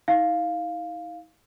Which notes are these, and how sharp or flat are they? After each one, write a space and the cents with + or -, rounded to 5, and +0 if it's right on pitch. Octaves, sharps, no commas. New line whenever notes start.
D#4 +45 F5 +0